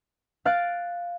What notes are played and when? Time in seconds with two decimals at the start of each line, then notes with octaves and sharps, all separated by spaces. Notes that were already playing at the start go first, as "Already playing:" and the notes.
0.45 F5 F#6 A6 D7